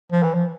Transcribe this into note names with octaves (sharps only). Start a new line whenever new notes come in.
F3
E3
F3